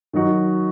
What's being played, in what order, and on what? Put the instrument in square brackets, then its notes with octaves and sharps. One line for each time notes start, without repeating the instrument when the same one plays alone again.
[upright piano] D#3 F#3 D#4 F#4